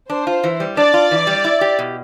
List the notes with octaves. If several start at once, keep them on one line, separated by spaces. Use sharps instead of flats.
D4 C5
F4
E3
G3
D4 D5
F4
E3
G3
E4
G4
B2